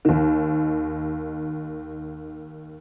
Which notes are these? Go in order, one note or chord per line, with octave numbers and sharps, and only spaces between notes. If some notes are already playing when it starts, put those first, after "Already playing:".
D#2 D#3